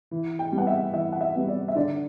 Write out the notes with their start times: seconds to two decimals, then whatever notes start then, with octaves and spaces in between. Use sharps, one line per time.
0.11 E3
0.39 G5
0.52 G3
0.58 B3 F#5
0.67 E5
0.93 E3 E5
1.12 F#5
1.21 E5
1.35 G3 B3
1.48 D5
1.68 E5
1.75 D3 D5